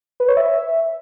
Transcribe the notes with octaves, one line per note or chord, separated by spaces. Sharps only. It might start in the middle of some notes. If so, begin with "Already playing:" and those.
B4
C#5
E5